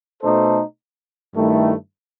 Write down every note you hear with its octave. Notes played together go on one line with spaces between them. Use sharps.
B2 A3 D#4 A4 C5
G2 D#3 A3 E4